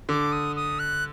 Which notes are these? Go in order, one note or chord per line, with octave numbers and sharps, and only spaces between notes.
D3 D6
D#6
D#6
F#6